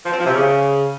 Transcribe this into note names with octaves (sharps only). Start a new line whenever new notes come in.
F3
C4
F3
C3
C#3